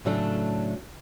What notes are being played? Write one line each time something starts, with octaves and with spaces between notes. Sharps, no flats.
A2 C#3 F#3 A3 D4 A4